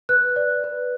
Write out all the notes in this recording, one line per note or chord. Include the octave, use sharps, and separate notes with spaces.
B4 F#6
D5
B4